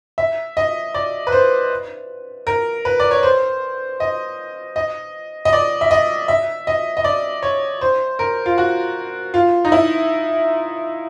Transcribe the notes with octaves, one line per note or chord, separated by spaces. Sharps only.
E5
D#5
D5
B4
C5
A#4
B4
D5
C#5
C5
D#5
D#5
D#5
D5
E5
D#5
E5
D#5
D#5
D5
C#5
C5
A#4
F4
F#4
F4
D#4
E4